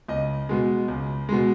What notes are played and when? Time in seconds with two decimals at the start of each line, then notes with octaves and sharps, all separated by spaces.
0.08 C#2 D#5
0.49 B2 G#3
0.88 C#2
1.29 B2 G#3